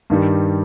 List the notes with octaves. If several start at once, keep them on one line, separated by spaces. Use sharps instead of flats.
G2 D#3 G3